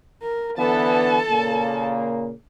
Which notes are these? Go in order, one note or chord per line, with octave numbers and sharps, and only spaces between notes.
A#4
D3 E3 B3 A4 A5
A#2 C#3 A#3